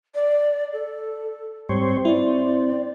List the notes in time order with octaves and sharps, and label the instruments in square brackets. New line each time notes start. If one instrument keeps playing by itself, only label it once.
[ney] D5
A4
[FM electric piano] G#2 [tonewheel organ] G3 C5 C#5 [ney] C4
[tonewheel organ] C4 [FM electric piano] E4 [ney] D5